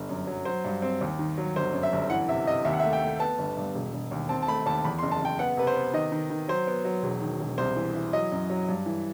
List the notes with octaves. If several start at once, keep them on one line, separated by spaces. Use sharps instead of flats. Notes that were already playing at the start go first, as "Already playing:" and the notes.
Already playing: G1
F#2
F#3
F#3 C5
G2
C4
D#2
D#3
F#3
G1 C5
F#2
E5
G1
E3 F#5
C3 E5
C3 D#5
D#2 E5
F#5
E5
A3
G5
A3
B3 A5
G1
G2
E1
E1
D#2
C4 A5
A5
A3 B5
D#2 A5
E2 B5
C6
F#1
A5
F#1 G5
B3 F#5
C3 B4
C5
B3
D#3 D#5
D#3
D#3
F#3 C5
B3
F#3
E1
D#3
E1
C2 C5
E3
E3
F#3 D#5
F#2
F#3
G2
E3